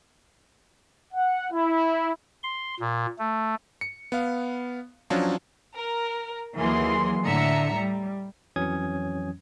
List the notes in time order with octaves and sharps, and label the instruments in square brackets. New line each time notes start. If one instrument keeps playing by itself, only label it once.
[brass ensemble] F#5
E4
[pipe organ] C6
A#2
A3
[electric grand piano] C#7
B3 F5
F3 F#3 C#4 D4 F4
[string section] A#4
D#2 E3 F#3 A#3 G#4 C6
A2 D3 E5 A#5 C#7
G3
[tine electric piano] F2 E3 F#3 C#4 D#6 G#6